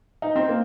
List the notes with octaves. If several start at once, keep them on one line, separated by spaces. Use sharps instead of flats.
D#4
C4
A#3